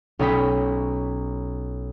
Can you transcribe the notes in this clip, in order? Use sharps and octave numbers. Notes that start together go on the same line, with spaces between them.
B1 C#4 D#5 G5 B5 B6